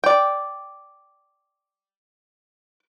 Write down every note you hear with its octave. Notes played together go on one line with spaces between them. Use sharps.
D5 G5